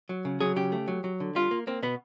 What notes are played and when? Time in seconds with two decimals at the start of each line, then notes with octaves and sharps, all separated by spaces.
0.09 F#3
0.25 C#3
0.40 F#3 G#4
0.56 C#3 G4
0.72 A3
0.88 F#3
1.04 F#3
1.20 D3
1.35 G3 F4
1.51 A#3
1.67 A#3 C4
1.83 B2 B3